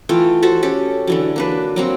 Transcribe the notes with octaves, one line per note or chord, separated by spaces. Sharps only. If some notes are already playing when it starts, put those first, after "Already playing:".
E3 A3 F4 G5
F#4 A4 C5
C#4 G4 A4
D3 E3 F#3
A#3 D4 B4
F#3 A#3 C4